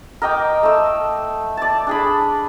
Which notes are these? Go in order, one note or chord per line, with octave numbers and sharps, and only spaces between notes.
A#4 D#5 G5 D6
A3 E6
D5 A5
D4 G#4 B5